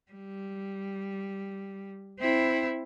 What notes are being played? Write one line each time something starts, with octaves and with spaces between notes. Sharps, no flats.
G3
C4 E4